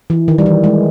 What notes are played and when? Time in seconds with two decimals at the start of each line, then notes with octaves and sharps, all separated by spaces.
0.10 E3
0.28 D#3
0.38 G3
0.46 E3
0.64 G#3